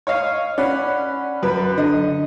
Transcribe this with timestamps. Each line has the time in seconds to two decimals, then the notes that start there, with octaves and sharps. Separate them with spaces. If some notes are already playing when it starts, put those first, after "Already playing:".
0.07 C#5 D#5 F5
0.58 C#4 D5 F#5 B5
1.43 F#2 B4
1.78 D3 D#5